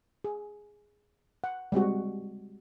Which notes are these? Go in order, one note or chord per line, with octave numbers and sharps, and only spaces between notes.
G#4
F#5
G3 G#3 C4 F#4